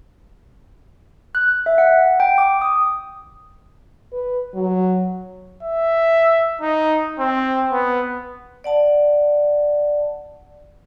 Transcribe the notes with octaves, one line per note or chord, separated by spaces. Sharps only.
F#6
E5
F#5
G5
D6
D#6
B4
F#3
E5
D#4
C4
B3
D5 F#5 A5